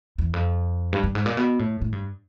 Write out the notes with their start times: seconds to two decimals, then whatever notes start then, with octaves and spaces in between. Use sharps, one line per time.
0.18 E2
0.33 F2
0.93 G2
1.04 G2
1.15 G#2
1.26 A#2
1.37 B2
1.59 A2
1.82 A2
1.92 G2